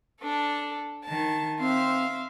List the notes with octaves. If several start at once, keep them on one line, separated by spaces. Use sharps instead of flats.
D4 A4
D#3 A5
C4 E5 F5 C6